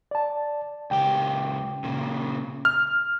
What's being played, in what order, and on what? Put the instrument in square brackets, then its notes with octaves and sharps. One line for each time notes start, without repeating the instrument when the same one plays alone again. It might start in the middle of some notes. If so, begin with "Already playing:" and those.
[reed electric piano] D5 A5
[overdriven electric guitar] C#2 G4 [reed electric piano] G5
[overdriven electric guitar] A#2 C#3
[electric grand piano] F6